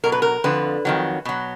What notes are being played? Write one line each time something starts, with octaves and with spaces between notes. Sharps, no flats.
B2 F#3 A#4
B4
A#4
F2 D3 F3 B4
F2 D#3 F#3
B2 F#3